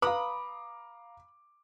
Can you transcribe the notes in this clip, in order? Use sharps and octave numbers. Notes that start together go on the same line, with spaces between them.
B4 F5 A#5 B5 D6 D#6